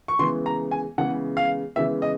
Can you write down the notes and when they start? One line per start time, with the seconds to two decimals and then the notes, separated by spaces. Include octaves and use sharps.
0.08 C#6
0.19 C#3 E3 G#3 B3 C6
0.46 A#5
0.71 G#5
0.98 C#3 E3 G#3 B3 F#5
1.37 F5
1.76 C#3 E3 G#3 B3 E5
2.02 D#5